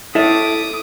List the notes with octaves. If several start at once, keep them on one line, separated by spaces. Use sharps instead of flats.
E4 A4 E5 D6 D#6